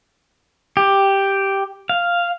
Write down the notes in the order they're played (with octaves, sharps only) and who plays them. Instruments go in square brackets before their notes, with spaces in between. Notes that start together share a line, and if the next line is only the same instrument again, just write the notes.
[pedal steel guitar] G4
F5